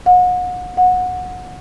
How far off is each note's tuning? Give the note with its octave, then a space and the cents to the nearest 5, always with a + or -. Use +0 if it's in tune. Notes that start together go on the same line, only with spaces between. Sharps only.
F#5 -35
F#5 -20